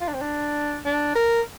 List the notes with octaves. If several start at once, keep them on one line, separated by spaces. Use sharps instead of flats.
F4
D4
C4
D4
D4
A#4